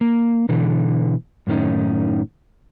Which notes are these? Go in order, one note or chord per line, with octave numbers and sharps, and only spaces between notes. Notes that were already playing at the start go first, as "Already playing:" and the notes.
A#3
B2 D3 E3
F#2 A2 D#3 C#4 D#4